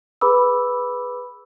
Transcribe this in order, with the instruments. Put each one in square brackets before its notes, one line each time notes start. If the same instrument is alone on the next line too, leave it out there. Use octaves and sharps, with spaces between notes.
[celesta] G#4 B4 B5 D6 E6